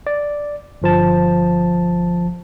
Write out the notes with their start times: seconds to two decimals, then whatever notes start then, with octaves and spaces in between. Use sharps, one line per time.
0.07 D5
0.82 G1 F3 A5